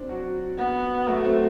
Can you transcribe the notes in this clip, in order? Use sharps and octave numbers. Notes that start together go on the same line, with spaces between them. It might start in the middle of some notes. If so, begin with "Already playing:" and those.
Already playing: C4 D4
F#3 F#4
B3
F#3 A3 F#4
C4